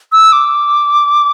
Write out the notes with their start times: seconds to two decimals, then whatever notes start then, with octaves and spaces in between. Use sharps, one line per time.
0.12 E6
0.32 D6